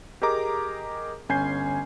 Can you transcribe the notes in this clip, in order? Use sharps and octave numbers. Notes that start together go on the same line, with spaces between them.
G4 G#4 A#4 D#5 A#5 D6
G1 C#4 G#5 G6 C7